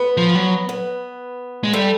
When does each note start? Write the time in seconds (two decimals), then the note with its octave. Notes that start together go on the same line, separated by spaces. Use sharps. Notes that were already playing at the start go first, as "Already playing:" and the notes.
Already playing: B3
0.17 F3
0.35 F#3
0.69 B3
1.64 G#3
1.73 G3 A3